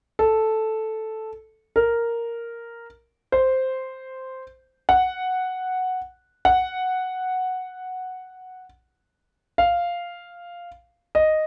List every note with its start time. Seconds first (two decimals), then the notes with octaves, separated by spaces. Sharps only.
0.19 A4
1.76 A#4
3.32 C5
4.89 F#5
6.45 F#5
9.58 F5
11.15 D#5